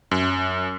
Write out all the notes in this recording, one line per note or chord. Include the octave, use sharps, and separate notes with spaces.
F#2